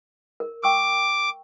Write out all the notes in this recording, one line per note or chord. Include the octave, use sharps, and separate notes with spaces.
A#4
G5 C#6 D6 E6